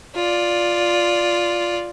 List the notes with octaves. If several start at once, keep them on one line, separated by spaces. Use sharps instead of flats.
F4 D5